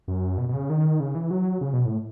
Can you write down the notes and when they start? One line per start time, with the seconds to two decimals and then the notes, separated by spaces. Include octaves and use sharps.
0.08 F#2
0.38 B2
0.49 B2
0.54 C#3
0.70 D#3
1.00 C#3
1.15 E3
1.31 F#3
1.61 C#3
1.73 B2
1.85 A2